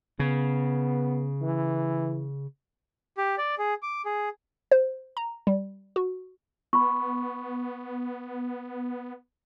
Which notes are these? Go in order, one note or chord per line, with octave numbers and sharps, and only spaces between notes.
C#3 B3
E3
G4
D5
G#4
D6
G#4
C5
A#5
G3
F#4
B3 B5 C#6